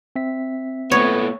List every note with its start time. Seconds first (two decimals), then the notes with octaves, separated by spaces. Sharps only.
0.16 C4 E5 B6
0.92 A#2 A3 B3 C#5